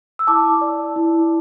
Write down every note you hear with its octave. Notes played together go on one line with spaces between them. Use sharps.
E6
E4 A5 D6
D5
E4